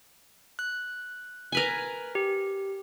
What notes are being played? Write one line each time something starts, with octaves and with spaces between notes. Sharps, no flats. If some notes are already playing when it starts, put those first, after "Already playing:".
F#6
A#4 B4 G#5
G4